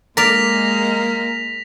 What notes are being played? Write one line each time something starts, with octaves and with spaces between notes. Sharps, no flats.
G#3 A#3 A#4 D5 A#6 B6 F7